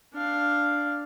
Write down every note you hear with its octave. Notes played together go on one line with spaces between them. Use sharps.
D4 F5